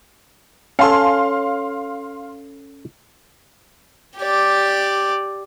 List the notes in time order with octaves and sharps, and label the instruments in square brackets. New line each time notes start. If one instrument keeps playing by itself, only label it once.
[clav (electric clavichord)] C#4 A4 [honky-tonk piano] F5 C6
[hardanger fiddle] G4 D5